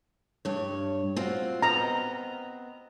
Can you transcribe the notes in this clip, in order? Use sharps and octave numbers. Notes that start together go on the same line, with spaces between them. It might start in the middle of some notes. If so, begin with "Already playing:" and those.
G2 C#5
C4 F4 F#4
B3 C4 D#5 A#5